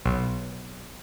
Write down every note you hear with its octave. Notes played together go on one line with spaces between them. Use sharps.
B1